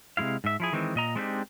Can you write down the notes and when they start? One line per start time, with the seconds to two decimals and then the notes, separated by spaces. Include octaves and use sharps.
0.17 C3 E3 G#3 E4 F5
0.44 G#2 E5
0.60 F3 E4 G#4
0.73 D#3 E3 G#3 C4
0.95 A#2 D#5 A#5
1.16 G#3 A3 C4 D4 D#4 G4